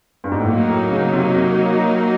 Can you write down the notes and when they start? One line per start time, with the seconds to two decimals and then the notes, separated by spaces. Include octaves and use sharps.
0.24 G2
0.32 G#2
0.40 A2
0.47 A#2 F#3 A#3 D#4
0.69 A2
0.91 C#3
1.13 C3
1.36 C3